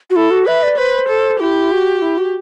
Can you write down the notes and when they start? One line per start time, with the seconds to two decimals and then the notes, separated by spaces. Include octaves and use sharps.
0.10 F#4
0.16 E4 A4
0.31 F#4
0.46 B4 E5
0.63 D5
0.77 B4 C5
1.09 A4
1.40 E4 G4
1.72 F#4
2.02 E4
2.18 F#4